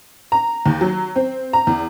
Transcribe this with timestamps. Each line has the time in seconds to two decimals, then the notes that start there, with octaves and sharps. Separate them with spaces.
0.32 A#5
0.66 D#2
0.81 F#3
1.16 C4
1.53 A#5
1.67 E2